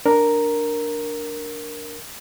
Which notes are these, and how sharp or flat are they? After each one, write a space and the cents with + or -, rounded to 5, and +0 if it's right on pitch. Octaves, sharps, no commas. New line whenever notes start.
D4 +0 A#4 +0